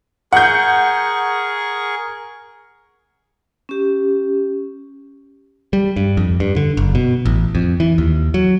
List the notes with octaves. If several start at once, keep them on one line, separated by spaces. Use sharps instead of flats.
G#4 A#4 F#5 C#6 G6
C#4 G4
G3
G2
F2
G2
D3
F#1
B2
A1
F2
E3
D#2
F#3